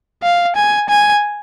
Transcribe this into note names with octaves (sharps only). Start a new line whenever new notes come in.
F5
G#5
G#5